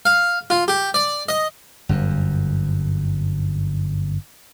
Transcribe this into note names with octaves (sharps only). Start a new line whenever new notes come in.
F5
F4
G4
D5
D#5
G1 F#2